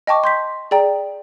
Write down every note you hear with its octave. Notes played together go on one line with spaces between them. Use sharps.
D#5 G5 A5 C#6 D6
C6 G6 B6
G#4 D5 G5 A#5